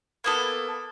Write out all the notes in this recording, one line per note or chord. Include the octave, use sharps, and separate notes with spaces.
A#3 B3 A4